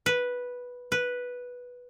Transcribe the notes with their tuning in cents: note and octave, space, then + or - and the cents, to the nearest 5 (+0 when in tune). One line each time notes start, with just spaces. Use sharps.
B4 -5
B4 -5